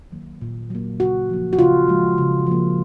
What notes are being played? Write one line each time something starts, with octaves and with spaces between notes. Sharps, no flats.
D#3 F#3 A#3
A#2
F#3 A#3
C#3 F#4
F3 A#3
F#4
C#3 F4
F3 G#3
C#3
F3 A#3